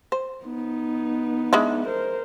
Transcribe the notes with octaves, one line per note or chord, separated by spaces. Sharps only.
C5
B3 D#4
G#3 D4 E4
A#4 C5